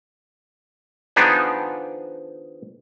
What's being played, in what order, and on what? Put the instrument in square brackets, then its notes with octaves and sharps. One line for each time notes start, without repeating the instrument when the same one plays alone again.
[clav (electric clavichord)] D#3 F3 B3 D4 D#4 G#4